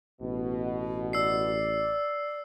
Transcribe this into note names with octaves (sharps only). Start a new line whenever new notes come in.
A1 B2
D5 E6 C7